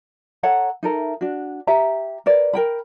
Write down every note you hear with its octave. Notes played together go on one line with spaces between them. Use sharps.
A4 C#5 F#5 A#5
D#4 A4 A#4 E5
D4 F#4
G4 E5 A#5
A#4 B4 D5
A#4 G5 B5